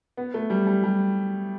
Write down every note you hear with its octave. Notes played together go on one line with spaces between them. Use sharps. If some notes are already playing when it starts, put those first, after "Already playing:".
B3
A3
G3
G3
G3